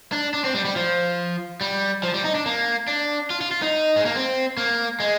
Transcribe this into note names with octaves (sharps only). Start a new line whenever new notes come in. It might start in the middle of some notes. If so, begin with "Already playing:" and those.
D4
D4
C4
G3
G3
F3
G3
F3
G3
D#4
D4
A#3
D4
F4
F4
F4
D#4
G#3
A#3
C4
A#3
G#3